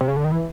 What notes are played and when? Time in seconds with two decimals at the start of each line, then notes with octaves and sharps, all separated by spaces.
0.01 C3
0.08 C#3
0.16 D3
0.24 D#3
0.32 E3